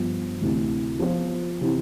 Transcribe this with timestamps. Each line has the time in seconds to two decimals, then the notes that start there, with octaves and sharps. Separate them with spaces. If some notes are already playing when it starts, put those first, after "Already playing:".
Already playing: G2 F3 B3
0.40 D2 C3 E3
0.99 F3 B3 F4 C5
1.61 C3 E3